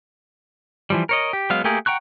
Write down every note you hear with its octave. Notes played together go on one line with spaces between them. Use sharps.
E3 F3 G3
A#4 C#5 D#5
G4
F#3 G#3 B3 F5
A3 A#3 G4 G#4 A#4
F#5 G5 A#5 C#6 F#6